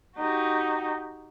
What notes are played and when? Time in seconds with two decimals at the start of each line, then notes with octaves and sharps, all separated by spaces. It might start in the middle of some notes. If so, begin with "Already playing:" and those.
0.17 D#4 F#4 G4